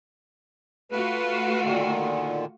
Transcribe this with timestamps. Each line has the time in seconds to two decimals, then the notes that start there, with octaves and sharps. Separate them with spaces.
0.91 A3 F4 F#4 B4
1.62 A#2 D3 D#3